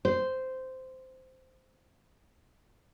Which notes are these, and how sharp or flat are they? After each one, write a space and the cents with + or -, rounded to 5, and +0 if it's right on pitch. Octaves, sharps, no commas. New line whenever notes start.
C5 -10